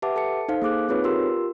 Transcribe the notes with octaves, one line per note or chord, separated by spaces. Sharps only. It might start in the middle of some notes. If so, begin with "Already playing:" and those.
G4 B4 E5 F#5 A5 D6
A4 A5 C#7
D#4 A4 C5 F5
A#3 G#4 D6 F#6
C4 D#4 F4 G#4 B4 C#5
F4 G4 A#4 C6 E6